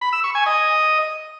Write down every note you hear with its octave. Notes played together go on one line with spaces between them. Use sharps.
B5
E6
C#6
G#5
D#5